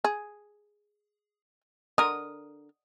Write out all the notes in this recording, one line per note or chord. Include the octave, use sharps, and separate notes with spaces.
G#4
D3 A#4 D#6